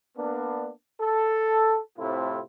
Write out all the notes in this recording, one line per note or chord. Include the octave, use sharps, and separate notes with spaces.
A#3 B3 D4
A4
A2 C3 A3 C4 E4 F4